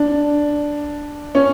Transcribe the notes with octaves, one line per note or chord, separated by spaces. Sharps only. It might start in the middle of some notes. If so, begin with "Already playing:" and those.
Already playing: D4
C#4